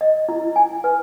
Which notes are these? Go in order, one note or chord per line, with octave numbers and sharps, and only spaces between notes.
D#5
E4
G#5
B4